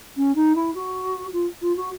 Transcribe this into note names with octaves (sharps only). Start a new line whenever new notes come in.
C#4
D#4
E4
F#4
F4
F4
F#4